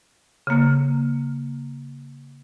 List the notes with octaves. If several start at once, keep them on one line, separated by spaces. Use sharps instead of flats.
C#3 A#3